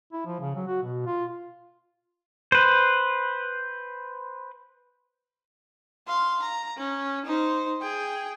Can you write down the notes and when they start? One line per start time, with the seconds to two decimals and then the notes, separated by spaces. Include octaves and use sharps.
0.13 E4
0.26 F3
0.40 C#3
0.55 F#3
0.67 F#4
0.82 B2
1.06 F4
2.52 B4 C5
6.07 F5 C6
6.42 A#5
6.77 C#4
7.25 D#4 C5
7.81 G#4 G5